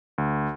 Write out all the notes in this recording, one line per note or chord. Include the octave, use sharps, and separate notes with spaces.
D2